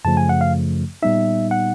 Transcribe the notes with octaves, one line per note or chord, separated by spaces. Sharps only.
F#2 C#3 F3 A3 A5
G#5
F#5
F5
A#2 G3 B3 D#4 E5
F#5